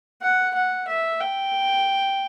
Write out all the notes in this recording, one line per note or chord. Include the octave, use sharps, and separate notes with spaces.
F#5
F#5
E5
G5